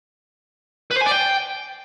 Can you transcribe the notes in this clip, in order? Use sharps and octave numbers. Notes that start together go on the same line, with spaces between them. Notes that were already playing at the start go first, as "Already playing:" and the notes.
B4
C5
G#5
D5
G5